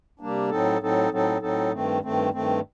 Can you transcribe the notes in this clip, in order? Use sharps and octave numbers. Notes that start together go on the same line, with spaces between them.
C3 G3 A#3 D4
A2 F#3 C4 D#4 A4
A2 F#3 C4 D#4 A4
A2 F#3 C4 D#4 A4
A2 F#3 C4 D#4 A4
G2 D#3 A3 C4
G2 D#3 A3 C4
G2 D#3 A3 C4